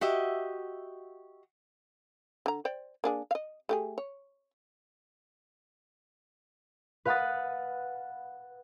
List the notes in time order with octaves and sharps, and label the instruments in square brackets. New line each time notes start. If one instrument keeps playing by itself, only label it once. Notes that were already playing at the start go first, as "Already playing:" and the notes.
[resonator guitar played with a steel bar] F#4 G4 D#5 E5
[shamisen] D3 A#5
C5 D5 G5
A#3 D4 G#4
D#5 F5
A3 G4 G#4
C#5
[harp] B4 F5 F#5 B5 D#6 A6